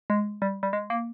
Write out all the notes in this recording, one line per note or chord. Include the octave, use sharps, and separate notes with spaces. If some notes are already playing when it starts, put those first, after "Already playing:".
G#3
G3
G3
G#3
A#3